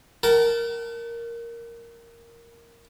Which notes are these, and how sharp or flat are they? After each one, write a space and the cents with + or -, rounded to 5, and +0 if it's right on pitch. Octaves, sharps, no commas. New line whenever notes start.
A#4 +0 F#5 +45 A5 -5